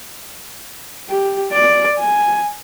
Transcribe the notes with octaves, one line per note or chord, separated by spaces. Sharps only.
G4
D5
G#5